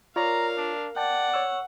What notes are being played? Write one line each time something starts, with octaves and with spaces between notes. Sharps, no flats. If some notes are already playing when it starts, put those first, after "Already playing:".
F4 A#4 C#5 D5 F5 A#5
D4
D5 F#5 G5 A5
C#5 C#6 E6